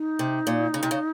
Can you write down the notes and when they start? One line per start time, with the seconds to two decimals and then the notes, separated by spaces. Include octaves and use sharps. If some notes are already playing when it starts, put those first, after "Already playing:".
Already playing: D#4
0.19 C3
0.47 A#2
0.74 C#3
0.83 C3
0.91 C#3